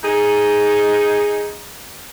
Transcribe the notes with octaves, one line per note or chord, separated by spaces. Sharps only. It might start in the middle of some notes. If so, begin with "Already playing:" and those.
D#4 G#4